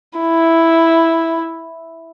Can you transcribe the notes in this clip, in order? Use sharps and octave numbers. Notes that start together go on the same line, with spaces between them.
E4